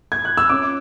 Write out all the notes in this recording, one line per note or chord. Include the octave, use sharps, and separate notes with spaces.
G#6
F#6
E6
C#4 D6